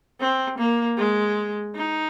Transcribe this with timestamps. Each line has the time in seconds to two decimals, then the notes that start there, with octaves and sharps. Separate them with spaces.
0.20 C4
0.58 A#3
0.98 G#3
1.75 D#4